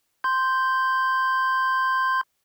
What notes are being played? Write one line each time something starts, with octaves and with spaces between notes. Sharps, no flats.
C6 G6